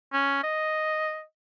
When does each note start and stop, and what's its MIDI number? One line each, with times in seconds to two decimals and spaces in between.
0.13 0.39 61
0.43 1.23 75